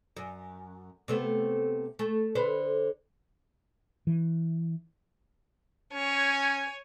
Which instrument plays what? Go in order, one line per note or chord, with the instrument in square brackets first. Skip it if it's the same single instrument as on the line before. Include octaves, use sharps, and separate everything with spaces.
[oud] F#2
C3 A3 B3
A3
D3 B4 C5
[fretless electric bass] E3
[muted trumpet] C#4 [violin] C#5 D#7 [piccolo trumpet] G#5